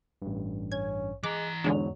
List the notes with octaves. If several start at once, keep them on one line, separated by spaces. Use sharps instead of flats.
A1 G2
C#4 G#6
E3 G#3 A#5 D6 F#6
E2 G#2 D3 F#3 G#3 D4